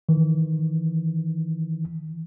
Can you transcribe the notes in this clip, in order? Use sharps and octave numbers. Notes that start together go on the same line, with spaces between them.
D#3 E3